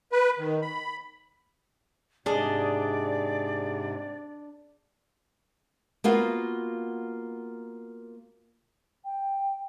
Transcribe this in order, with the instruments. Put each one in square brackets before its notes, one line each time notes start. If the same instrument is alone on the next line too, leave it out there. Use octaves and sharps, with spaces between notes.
[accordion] B4
D#3
B5
[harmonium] G#2 C3 [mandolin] D4 D#5 [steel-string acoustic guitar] G#4 [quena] D5
[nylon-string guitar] A#3 B3 F4 F#4
[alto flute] G5